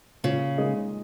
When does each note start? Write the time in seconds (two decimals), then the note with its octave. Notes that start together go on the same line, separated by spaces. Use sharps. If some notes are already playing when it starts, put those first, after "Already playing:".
0.23 A#2 C#3
0.58 G#3 D#4 G#4 D#5